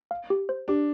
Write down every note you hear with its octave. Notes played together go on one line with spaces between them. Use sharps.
F5
G4
C5
D4 G4